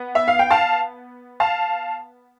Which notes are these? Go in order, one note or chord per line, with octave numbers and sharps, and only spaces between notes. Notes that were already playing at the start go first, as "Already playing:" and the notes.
Already playing: B3
E5
F5
G5
F5 A5
F5 A5